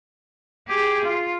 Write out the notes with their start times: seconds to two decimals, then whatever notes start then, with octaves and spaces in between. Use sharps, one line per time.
0.67 G4 G#4
1.04 F4